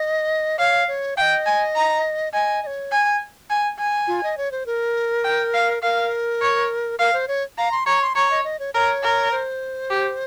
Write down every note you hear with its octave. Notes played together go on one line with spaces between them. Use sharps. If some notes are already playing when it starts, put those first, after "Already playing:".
Already playing: D#5
C#5 F5
C#5
D#5 F5 G5
G#5
A#5
D#5 G#5
D#5
C#5
G#5
G#5
G#5
F4
D#5
C#5
C5
A#4
G5
F5
A#4 F5
C#5
A#4 F5
C5
C#5
F5 A#5
C6
C#5 A#5
C6
C#5 A#5
D#5
D#5
C#5
A#4 C#5
A#4
C5
G4